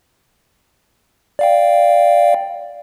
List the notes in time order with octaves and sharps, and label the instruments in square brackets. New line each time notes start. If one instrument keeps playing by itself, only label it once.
[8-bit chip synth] D5 F5 G5